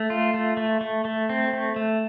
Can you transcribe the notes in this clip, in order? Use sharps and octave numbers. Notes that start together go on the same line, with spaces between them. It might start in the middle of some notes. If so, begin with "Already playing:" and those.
Already playing: A3
F4
A3
A3
A3
A3
C4
A3
A3